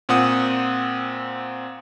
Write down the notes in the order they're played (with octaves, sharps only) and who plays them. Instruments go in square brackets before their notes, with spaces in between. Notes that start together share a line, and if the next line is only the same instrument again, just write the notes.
[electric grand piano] A#2 C4 F#5 D#6